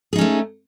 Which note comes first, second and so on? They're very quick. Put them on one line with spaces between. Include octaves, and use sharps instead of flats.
G#4 D#4 C#4 A3